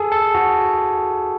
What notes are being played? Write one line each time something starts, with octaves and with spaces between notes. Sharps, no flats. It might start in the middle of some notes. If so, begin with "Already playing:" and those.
Already playing: G#4 A4
A4
F#4